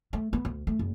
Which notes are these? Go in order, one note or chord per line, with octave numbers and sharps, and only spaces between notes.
A3
B3
D2
A3
F#1